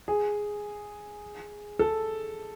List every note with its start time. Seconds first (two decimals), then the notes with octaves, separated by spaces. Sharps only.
0.08 G#4
1.79 A4